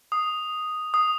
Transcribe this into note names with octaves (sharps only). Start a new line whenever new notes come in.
D#6
D#6